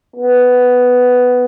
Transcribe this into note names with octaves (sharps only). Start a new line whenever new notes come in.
B3